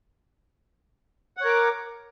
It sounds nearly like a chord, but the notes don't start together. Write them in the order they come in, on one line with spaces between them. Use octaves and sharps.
F#5 C#5 A#4 D6